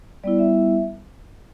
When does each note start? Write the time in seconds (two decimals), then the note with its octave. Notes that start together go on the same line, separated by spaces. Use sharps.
0.24 G3 B3 E4 D5
0.39 E5